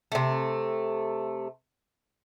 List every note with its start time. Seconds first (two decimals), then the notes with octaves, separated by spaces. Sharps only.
0.12 C3 A3